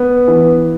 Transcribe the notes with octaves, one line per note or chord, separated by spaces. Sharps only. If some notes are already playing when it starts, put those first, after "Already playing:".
Already playing: B3
E3